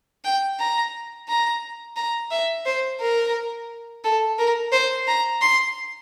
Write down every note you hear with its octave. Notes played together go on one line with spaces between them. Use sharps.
G5
A#5
A#5
A#5
E5
C5
A#4
A4
A#4
C5
A#5
C6